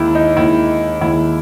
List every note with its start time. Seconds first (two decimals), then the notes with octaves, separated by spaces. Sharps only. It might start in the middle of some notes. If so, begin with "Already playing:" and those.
Already playing: D#2 D#3 G#3 E4
0.15 D#4
0.37 D#2 D#3 G#3 E4
1.01 D#2 D#3 G#3 E4